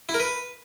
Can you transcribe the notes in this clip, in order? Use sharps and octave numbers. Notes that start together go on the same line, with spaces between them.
E4
A#4
B4